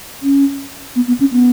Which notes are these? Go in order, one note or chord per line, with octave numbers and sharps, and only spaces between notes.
C#4
B3
B3
C#4
B3